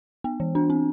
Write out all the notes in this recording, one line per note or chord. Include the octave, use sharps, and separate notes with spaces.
B3
E3
D4
C4